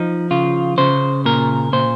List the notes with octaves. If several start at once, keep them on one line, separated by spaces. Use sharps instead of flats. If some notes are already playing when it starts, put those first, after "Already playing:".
Already playing: F3 D#4
C#3 F4
C#3 C5
A#2 A#4
A#2 C5